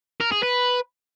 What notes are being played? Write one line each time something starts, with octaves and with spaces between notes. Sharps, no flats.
A#4
G#4
B4